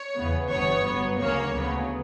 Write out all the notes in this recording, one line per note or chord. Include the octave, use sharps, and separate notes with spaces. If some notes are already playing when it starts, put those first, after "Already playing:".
Already playing: C#5
E2 C#3 E3 B3
G1 G2 E3 B3 C#5
G1 G2 F#3 B3
D2 C#3 F#3 A#3 C#5
D2 C#3 F#3 B3